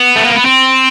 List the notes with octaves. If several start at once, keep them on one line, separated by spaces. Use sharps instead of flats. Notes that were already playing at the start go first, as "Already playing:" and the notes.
Already playing: B3
A3
A#3
B3
C4